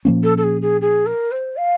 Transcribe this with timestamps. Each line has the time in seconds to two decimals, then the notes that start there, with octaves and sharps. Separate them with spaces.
0.05 A#2 F3 A#3 C#4
0.23 A4
0.38 A4
0.43 G#4
0.62 G#4
0.81 G#4
1.06 A#4
1.32 C5
1.57 F5